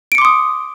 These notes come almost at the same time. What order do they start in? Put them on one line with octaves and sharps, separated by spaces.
D7 C#7 D6 C6 D#6